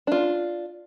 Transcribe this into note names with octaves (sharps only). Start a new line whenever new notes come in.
D4 F4